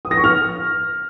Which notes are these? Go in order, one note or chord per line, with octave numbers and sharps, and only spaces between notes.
D#6
A#6
C#6
F6